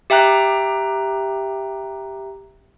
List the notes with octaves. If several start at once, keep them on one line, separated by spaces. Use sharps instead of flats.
G4 E5 G5 A#5 F#6